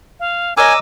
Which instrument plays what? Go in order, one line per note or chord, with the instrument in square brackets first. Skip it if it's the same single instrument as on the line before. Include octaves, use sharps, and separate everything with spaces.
[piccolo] F5
[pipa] A#4 C#5 D#5 [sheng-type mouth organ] G#5 [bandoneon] D6 E6 [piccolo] D#7